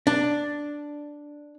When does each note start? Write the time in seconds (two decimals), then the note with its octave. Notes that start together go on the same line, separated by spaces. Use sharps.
0.07 D4